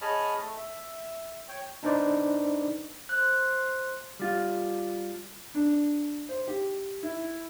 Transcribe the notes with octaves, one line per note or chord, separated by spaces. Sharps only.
G#4 C#5 D#5 A5 B5 F6
A3
E5
C#5 G5
D4 D#4 B4 C5 D5
C5 F#6
G3 F4
D4
C5
G4
E4